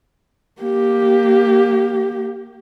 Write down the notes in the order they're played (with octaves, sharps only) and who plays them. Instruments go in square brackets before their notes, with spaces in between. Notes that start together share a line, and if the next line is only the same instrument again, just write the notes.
[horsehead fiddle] A#3 G4